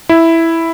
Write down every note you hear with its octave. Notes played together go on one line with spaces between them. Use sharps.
E4